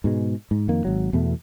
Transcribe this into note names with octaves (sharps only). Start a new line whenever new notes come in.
G#2 B2 G#3
G#2
F2 D#3 A#3
G#1 F#3
E2 B2 A3